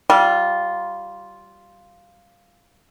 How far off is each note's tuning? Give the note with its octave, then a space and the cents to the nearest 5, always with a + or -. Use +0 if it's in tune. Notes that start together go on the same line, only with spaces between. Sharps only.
G3 -20 F4 +0